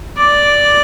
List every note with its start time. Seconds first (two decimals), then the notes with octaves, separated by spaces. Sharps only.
0.17 D5